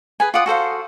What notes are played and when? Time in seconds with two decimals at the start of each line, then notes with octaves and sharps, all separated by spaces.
0.20 G#4 B4 G#5
0.34 F4 D5 F#5 D#6
0.46 F#4 A4 C5 F5